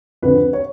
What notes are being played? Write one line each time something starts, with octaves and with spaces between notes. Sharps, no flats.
F2 D3 B4
C#5